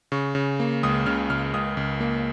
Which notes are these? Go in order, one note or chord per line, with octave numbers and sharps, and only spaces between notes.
C#3 C#6
C#3
A#3
C#2 D#6
C#3 F6
C#2 F6
C#2 D#6
C#2
A#3